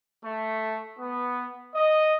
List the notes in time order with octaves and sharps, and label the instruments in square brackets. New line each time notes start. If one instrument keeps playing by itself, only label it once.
[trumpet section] A3
B3
D#5